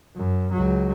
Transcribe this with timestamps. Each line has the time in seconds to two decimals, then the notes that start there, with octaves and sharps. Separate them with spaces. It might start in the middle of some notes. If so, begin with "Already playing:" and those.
0.15 F#2
0.52 C#2 F#3